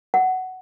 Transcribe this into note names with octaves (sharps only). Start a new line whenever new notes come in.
F#5